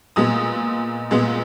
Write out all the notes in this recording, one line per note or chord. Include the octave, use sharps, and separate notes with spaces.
A#2 G#3 B3 D#6
A#2 G#3 B3